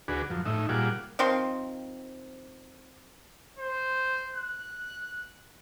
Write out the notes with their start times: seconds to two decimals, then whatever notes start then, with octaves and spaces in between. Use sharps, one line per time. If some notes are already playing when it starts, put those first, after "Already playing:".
0.08 D2 D4 F#4 G#4 B4
0.30 F#2 F3
0.46 A2 D#4 E5
0.69 A#2 G3 F4 G#4 F#5 D6
1.19 D#3 F3 C4 C6
3.58 C5
4.35 F#6